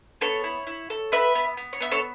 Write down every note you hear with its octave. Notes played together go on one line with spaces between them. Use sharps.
B3 A4 C#5
E4
E4
A4
B3 B4 E5
B3
B3
C#5
B3 E5
A4 C#5